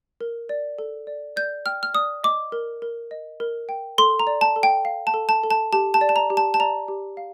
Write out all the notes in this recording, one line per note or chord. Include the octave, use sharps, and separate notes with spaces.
A#4
D5
A4
D5
D5 G6
G5 F6
F6
D5 D#6
D#5 D6
A#4
A#4
D#5
A#4
G5
A4 C6
A#5
D5
A5
A4
G5
F5
A5
A4
A5
A4
A5
G4 A5
A5
D5
A5
A#5
G4
A5
A5
D5 A#5
G4
F5